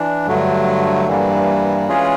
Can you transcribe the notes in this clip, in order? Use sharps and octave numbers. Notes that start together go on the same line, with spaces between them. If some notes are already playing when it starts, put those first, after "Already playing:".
Already playing: E3 D4
G2 D3 F#3 A3
G2 E3 G3 A#3
E3 G#3 C#4 F4 G#4